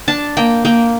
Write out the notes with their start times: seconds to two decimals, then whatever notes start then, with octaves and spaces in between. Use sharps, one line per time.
0.08 D4 A5
0.37 A#3 G5
0.65 A#3 G5